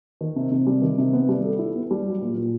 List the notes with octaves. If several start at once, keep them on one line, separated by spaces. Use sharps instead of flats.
D#3
C3
C3
G3
D#3
C3
B3
G3
A4
E4
B3
G3
F#3
A#2
A#2